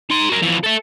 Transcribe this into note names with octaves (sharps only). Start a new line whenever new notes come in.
D#4 C6
F#4 A#4
F2 E3
A4 E5